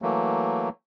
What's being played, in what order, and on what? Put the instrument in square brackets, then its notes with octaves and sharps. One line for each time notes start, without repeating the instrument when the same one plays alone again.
[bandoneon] E3 F#3 A3 A#3